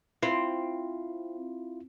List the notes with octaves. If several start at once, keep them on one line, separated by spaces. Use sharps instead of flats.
C4 E4 F4